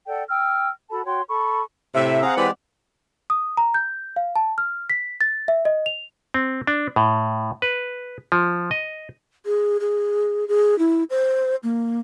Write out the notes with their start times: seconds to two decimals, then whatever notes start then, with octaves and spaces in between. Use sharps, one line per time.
0.08 A4 D5 F#5 G5
0.28 G5 E6 F6
0.90 F#4 A4 A5 B5
1.05 F#4 C#5 G5 C6
1.28 A4 B5 C#6
1.95 A2 C3 E5
2.22 C4 G#4 F5 F#5 A#5
2.37 E3 G#3 G4 B4 D5
3.30 D#6
3.57 A#5
3.74 G6
4.16 F5
4.36 A5
4.58 F6
4.90 B6
5.21 A6
5.48 E5
5.65 D#5
5.86 F7
6.34 C4
6.67 D4
6.96 A2
7.62 B4
8.32 F3
8.71 D#5
9.46 G#4
9.80 G#4
10.48 G#4
10.79 E4
11.10 C5
11.63 A#3